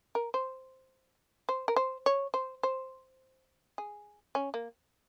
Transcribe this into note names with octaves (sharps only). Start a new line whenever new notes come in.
A#4
C5
C5
A#4
C5
C#5
C5
C5
G#4
C#4
A#3